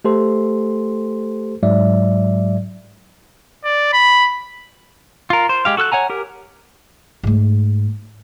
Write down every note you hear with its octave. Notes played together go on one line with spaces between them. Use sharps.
A3 G4 A4 C5 C6
G#2 F#3 G#3 D5 E5
D5
B5
F4 A#4
C5
G#3 G4 F5
F#4 A4 E6 F#6
C#5 F#5 G#5 A#5
G4 A#4
G#2 A3